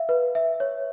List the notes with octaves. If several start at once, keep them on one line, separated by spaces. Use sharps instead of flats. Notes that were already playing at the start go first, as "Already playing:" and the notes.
Already playing: E5 F5
B4
E5
C#5